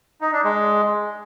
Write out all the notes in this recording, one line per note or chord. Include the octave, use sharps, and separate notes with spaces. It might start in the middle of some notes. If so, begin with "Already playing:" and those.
D#4
D4
G#3